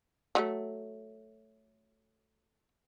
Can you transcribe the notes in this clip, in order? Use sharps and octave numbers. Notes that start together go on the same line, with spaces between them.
F3 F#3 A3